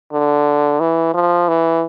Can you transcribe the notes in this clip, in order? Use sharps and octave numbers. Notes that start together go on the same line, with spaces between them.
D3
E3
F3
E3